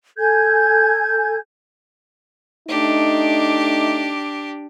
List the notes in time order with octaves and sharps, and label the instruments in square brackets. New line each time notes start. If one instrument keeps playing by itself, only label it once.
[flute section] A4 G#5 G6 G#6
[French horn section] A3 D#4 [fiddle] D4 G4